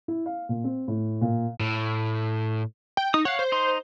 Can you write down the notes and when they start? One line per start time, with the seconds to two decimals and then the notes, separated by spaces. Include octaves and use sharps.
0.08 E4
0.26 F5
0.49 A#2
0.64 C4
0.88 A2
1.21 A#2
1.60 A2
2.97 G5
3.14 D#4 D#6
3.25 C#5 F5 F#5
3.39 C5
3.52 D#4 C6